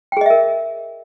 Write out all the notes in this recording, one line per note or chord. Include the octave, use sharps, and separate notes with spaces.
G#4 A#4 D#5 E5 G5